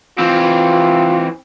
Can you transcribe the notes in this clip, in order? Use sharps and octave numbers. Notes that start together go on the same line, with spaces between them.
E3 C4 F4